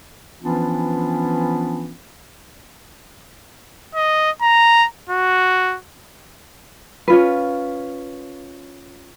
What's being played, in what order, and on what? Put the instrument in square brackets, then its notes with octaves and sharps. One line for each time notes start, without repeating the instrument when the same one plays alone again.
[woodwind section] E3 F3 B3 C#4 D4 F4
[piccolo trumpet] D#5
A#5
F#4
[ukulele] C#4 F4 B4